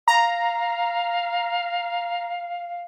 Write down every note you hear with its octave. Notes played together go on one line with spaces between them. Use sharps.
F5 A#5